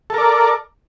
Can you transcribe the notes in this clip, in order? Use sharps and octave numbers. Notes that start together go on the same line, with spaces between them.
A4 A#4 D5